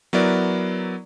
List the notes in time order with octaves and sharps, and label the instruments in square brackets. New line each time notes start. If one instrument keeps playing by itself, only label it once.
[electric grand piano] F#3 B3 E4 A#4 D5